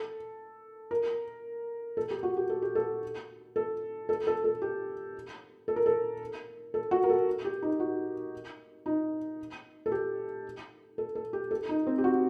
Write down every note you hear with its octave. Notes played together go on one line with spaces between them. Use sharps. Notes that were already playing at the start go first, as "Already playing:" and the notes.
Already playing: A4
A#4
A4
G4
F#4
G4
A4
G4
A4
A4
A4
A4
A4
G4
A4
A#4
A4
A4
F#4
A#4
A4
G4
D#4
F#4
D#4
A4
G4
A4
A4
G4
A4
D#4
C4
G4
F#4